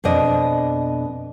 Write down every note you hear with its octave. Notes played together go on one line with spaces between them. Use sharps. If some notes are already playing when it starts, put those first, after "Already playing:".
F2 B2 D4 D#5